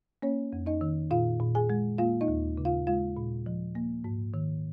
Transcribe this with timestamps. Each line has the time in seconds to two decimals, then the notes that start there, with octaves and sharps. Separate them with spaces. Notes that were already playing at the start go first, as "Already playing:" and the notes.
0.22 A#3 C#4 C#5
0.53 F2
0.66 D#4 D#5
0.81 D#3
1.11 A#2 F4 F5
1.40 A#2
1.55 G#4 G#5
1.70 G#3
1.98 A#3 F4 F5
2.21 D#4 D#5
2.28 D#2
2.58 C#3
2.65 F4 F5
2.87 G#3 F4 F5
3.17 A#2
3.46 F3
3.75 A#3
4.04 G#2
4.34 D#3